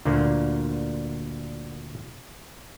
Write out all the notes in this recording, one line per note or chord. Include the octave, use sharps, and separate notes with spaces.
D2 A#2 D3 A#3